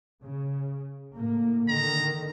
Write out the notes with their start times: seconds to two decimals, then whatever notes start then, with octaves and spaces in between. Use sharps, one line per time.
0.23 C#3
1.14 A2 A#3
1.69 D3 D#3 A#5